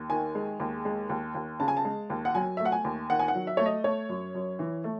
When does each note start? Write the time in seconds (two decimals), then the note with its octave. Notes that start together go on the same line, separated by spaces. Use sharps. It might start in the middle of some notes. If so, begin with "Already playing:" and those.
Already playing: D#2
0.10 D#3 G#5
0.35 G#3
0.60 D#2
0.85 G#3
1.09 D#2
1.35 D#2
1.60 C#3 A5
1.68 G#5
1.77 A5
1.85 G#3
2.10 D#2
2.25 F#5
2.35 F#3 G#5
2.57 E5
2.60 A3
2.65 F#5
2.72 G#5
2.85 D#2
3.09 D#3 F#5
3.19 G#5
3.28 F#5
3.34 F#3
3.47 E5
3.57 A3 C#5
3.66 D#5
3.84 A3 C#5
4.09 F#2
4.35 F#2
4.59 E3
4.84 A3